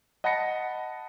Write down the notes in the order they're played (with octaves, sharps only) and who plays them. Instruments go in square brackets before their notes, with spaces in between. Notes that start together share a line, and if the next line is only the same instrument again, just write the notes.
[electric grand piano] D#5 F#5 A5 B5 A#6 C#7